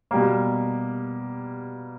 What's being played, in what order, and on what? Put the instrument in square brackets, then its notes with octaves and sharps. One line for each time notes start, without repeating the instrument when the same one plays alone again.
[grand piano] B2 G3 A#3